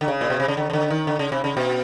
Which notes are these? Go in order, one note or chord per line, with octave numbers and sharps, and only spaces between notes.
D3
C#3
A#2
B2
C3
C#3
D3
C#3
D3
D#3
D3
C#3
C3
C#3
B2